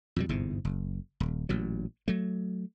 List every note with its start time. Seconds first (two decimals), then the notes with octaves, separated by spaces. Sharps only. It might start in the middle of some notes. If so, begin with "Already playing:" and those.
0.16 F2 B2 G3
0.29 G1 E2 G#2 C3
0.65 F#1
1.20 D#1
1.49 A1 A#2 F#3
2.08 F#3 A3